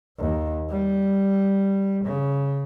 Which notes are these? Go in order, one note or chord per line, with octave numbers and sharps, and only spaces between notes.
D#2
G3
C#3